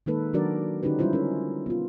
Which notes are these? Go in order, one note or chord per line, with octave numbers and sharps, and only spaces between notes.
D#3 G#3 A#3 D#4 A4 B4
D#3 F#3 D4 F#4 A#4 D5
D3 C#4 D#4 F#4 G4 B4
G3 G#3 C#4 E4 F4 C5
C#4 A#4
B3 F4